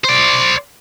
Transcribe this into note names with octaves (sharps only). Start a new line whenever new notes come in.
C5 D5